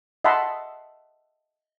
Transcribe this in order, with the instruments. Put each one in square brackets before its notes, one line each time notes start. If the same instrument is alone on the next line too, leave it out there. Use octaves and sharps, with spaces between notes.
[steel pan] D#5 E5 F#5 A5 B5 C6